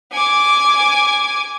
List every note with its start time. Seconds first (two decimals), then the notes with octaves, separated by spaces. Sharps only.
0.12 G#5 D6